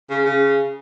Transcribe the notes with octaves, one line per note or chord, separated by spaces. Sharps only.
C#3
C#3